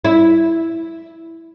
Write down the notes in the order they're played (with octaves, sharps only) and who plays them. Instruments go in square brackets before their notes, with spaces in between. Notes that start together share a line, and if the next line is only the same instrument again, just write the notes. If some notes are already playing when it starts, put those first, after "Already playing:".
[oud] E4